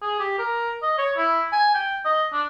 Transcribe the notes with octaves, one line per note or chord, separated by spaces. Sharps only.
G#4
G4
A#4
D#5
C#5
E4
G#5
G5
D#5
D4